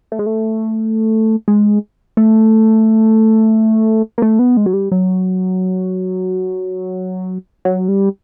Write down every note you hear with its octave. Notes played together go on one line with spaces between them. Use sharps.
A3
G#3
A3
G#3
A3
A#3
A3
B3
G#3
F#3
G3
F#3
F#3
G3